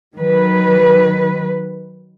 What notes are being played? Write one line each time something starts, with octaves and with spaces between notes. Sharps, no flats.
D#3 F#3 B4